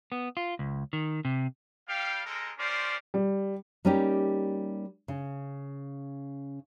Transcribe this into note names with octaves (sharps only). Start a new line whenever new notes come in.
B3
F4
C#2
D#3
C3
G3 F5 G5
G#3 C4 A4 A#4
C#4 F4 G4 A#4 C5 D5
G3
G3 A#3 C#4 D#4 G4
C#3